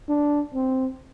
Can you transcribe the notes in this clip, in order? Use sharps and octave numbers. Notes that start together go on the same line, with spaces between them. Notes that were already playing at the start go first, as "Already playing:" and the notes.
D4
C4